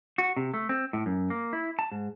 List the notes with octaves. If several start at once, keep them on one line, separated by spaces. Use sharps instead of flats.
F#4
C3
A3
C4
A2
F#2
A#3
E4
A5
G#2